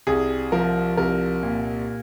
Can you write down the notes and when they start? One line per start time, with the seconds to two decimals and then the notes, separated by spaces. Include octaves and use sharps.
0.07 C2 G#4
0.52 F3 A#4
0.97 C2 A#4
1.43 A#2